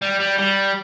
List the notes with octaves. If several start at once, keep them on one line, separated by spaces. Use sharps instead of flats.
G3
G3
G3